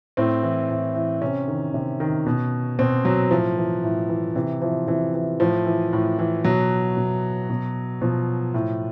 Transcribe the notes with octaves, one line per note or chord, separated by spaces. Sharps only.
A2 C4
E3
A2
E3
C3 C#4
D#3
C3
D#3
B2
B2 C4
F#3
A2 F3
E3
A2
E3
C3 E3
E3 F3
C3 E3
E3
A2 F3
E3
A2
E3
B2 F#3
B2
B2
B2 F3
A2